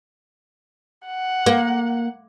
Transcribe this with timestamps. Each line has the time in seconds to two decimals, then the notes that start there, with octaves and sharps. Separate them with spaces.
1.06 F#5
1.46 A#3